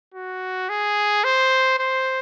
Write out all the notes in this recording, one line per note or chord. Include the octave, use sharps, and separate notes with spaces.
F#4
G#4
C5
C5